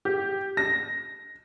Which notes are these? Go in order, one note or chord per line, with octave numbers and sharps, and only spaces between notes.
G4
A#6